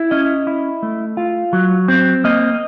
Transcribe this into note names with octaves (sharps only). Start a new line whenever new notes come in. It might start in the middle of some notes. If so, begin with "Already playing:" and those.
Already playing: E4
C#4 D#5
E4
A3
F4
F#3
C4
A#3 D#5